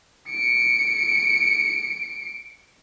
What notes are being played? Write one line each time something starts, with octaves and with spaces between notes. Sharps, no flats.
C#7 D7